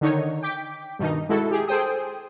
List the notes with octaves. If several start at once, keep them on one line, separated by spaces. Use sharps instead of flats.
D3 D#3 D#4 C#5
G5 D6 B6
G2 B2 D#3 D#4
G#3 E4 F#4 A4
G4 G#4
G#4 A4 C5 G5 D#6